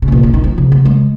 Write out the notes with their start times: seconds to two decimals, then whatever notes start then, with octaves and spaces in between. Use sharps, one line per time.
0.02 C#3
0.08 G#2
0.12 A#2
0.23 C#3
0.34 D#3
0.44 F3
0.58 C#3
0.72 C#3
0.85 G#3